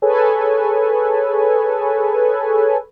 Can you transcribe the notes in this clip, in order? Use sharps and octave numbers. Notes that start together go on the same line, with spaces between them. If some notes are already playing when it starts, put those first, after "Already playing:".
G#4 A4 B4 C#5 G#5